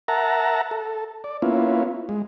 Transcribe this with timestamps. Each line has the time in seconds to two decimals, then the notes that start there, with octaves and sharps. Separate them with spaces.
0.08 A#4 E5 F#5 A5 A#5
0.71 A4
1.24 D5
1.42 A#3 B3 C#4 E4 F4
2.09 G#3